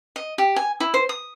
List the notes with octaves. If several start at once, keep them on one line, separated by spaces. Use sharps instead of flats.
D#5
G4
G#5
E4
C5
D#6